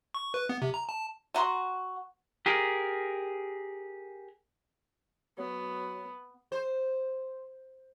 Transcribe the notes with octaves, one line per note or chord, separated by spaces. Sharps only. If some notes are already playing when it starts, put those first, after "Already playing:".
C#6
B4
B3
C3
A#5
A5
A3 F#4 A#5 C6
G4 G#4 A#4
F#3 B3
C5